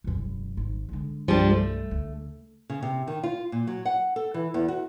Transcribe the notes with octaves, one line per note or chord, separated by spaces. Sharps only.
E1 F#2
G#1
D3 G#3
C2 G2 F3 G3 D4
A3
D2
C#3
C3
D#3
F4
A#2
F#3
F#5
A4
E3
E2
F#4